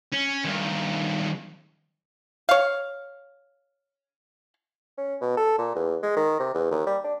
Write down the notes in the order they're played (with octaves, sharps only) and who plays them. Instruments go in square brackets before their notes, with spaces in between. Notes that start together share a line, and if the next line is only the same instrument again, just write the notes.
[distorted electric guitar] C#4
G2 D#3
[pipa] C#5 F5
[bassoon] C#4
B2
A4
A#2
E2
G#3
D#3
C3
E2
D#2
G3
D4